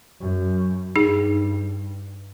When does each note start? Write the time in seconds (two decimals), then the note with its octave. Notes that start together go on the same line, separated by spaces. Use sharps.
0.21 F#2
0.96 G2 D#4 G#4